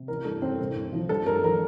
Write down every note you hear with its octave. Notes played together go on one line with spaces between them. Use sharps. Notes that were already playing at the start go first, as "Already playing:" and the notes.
Already playing: C3
A1 A#4
G2 A4
A1 C4 C5
C2
C2
F3
G2 A4
G2 A#4
F3 A#4